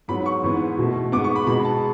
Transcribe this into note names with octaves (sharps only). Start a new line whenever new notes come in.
G#2 F#3 B3 B5
C#6
G#2 E3 B3
B2 A3
G#2 G#3 B3 D6
C#6
B5
B2 G#3 B3 B5
A5